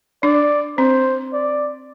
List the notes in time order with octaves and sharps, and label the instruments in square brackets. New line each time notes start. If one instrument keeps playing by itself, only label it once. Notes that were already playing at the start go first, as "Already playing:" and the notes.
[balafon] D4 [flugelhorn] D5
[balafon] C4 [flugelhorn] C5
[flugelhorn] D5